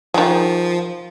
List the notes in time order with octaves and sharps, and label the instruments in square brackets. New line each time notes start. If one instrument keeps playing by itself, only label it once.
[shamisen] D#3 G#4 [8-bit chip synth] F3